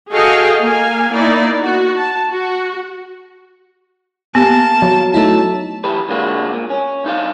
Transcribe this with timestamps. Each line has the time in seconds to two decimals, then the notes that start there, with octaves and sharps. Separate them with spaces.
0.12 F#4 G#4 A4 D#5 F5 G5
0.60 A#3 F5 G#5
1.12 A#3 B3 D#4 E4 D5
1.62 F#4
1.96 A5
2.31 F#4
4.35 A#3 B3 G4 A5
4.82 F#3
5.14 A3 D#4 E4 A5
5.84 E3 G4 A4 B4
6.09 D3 G#3 A#3 F4 F#4
6.53 A#2
6.70 C#4
7.04 C2 D#4 A4 F5